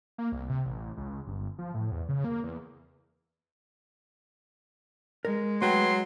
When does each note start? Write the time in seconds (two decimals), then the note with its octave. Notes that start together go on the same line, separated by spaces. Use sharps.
0.18 A#3
0.32 C2
0.50 C3
0.66 A1
0.97 C#2
1.27 G1
1.58 F3
1.74 A2
1.92 E2
2.09 C#3
2.24 A#3
2.44 E2
5.25 G#3 A#4
5.62 F#3 A3 B4 G5 C6